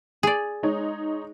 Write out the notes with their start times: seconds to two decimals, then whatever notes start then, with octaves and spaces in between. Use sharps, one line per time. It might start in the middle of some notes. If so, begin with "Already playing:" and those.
0.23 G#4 D5
0.63 G#3 D#4 C#5